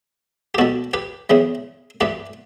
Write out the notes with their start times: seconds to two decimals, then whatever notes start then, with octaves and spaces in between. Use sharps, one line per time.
0.55 G4
0.58 B2 G3 F#4 A4
0.94 G4 B4
1.30 E2 C#3 E3 G3
2.01 G2 E3 G3 G4 B4